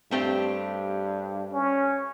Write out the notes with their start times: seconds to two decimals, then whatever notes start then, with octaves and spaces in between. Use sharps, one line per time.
0.11 G2 A3 C4 G4
1.54 C#4